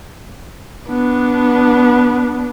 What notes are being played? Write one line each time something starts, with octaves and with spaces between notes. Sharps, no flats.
B3 D4